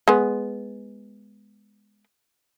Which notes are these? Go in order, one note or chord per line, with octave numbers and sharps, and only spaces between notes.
G#3 B3